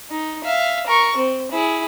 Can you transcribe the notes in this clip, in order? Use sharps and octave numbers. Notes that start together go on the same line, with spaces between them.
D#4
E5 F5
A#4 C#6
C4
E4 G#4